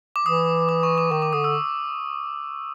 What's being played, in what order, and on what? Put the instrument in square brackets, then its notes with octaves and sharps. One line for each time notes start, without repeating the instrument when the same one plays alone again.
[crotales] D6
[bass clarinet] E3 [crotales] D#6
[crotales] D6
C#6
D6
[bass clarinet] D#3 [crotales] C#6
[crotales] D6
[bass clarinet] D3 [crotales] D#6
[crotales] E6